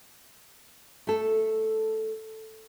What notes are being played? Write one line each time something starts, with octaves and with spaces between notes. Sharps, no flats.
A3 A4